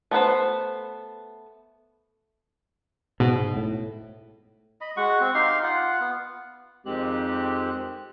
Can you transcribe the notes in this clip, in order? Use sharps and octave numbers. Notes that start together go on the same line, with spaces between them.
A3 B3 B4 C5
G#2 B2
A2
D#5 B5
G#3 F#4 F#5 C#6
C4
D#4 G4 F5 C6
F4 F#5
B3
F2 D#3 G#3 C4 G4 F#6